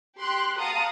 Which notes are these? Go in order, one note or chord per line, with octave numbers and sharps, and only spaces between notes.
G4 C6 F#6
F5 F#5 A5 A#5 D#6